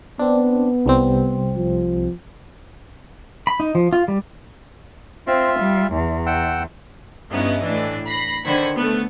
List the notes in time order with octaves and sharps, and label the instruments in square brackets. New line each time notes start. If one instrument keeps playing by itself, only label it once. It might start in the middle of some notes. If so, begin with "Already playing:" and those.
[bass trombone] B3 [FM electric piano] C4 D4
[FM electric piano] C2 G3 C4
[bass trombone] F3
[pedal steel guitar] B5
D#4
F3
F4
G3
[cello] C4 [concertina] F4 E5
[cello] G3
E2
[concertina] F#5 G5 E6
[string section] G2 B3 C#4 D#4 E4
A2 E3 D4
B5 A#6 C7
D3 D#3 C5 B5 G#6 C#7
A3 B3